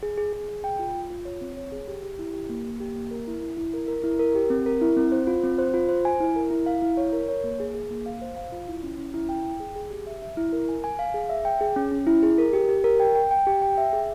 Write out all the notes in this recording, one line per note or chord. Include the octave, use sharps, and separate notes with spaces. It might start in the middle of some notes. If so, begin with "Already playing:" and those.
G#4
G#4
G#4
G#4
G5
F4
F4
F4
C#5
C4
C#5
G#4
G4
G4
E4
G4
A#3
A#3
G4
A#3
A#4
E4
E4
E4
A#4
A#4
E4
A#4
G4
C4
A#4
E4
C4
C5
F4
C4
C5
F4
C5
G#5
E4
A#4
E4
F5
E4
C#5
A#4
C#5
A#3
G#4
G#4
A#3
F5
C5
F5
F4
E4
C#4
C#4
E4
G5
G5
G#4
G#4
G4
E5
E5
E4
A#4
G#5
G#5
F5
G#4
E5
G5
G#4
C#4
C#4
E4
G#4
A#4
G4
G4
A#4
G5
G5
G5
G4
G5
E5
G#4